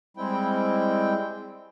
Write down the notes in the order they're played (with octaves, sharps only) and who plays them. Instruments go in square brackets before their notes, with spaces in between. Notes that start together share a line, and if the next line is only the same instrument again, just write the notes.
[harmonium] G3 G#3 C4 E4 G5